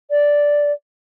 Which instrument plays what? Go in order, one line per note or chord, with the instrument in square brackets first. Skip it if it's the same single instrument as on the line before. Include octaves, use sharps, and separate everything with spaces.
[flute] D5